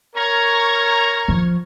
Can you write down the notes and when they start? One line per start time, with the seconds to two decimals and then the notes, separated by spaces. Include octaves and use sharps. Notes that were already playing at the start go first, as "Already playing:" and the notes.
0.16 A#4 C#5 A#5 C#6 F6 G#6
1.28 F3